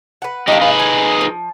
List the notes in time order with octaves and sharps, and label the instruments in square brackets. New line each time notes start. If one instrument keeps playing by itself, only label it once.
[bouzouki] B4 F#5
[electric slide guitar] D4 D#4 G4 [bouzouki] D#5 F5
[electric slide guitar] D#4 G#4 B4
[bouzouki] G#5
F3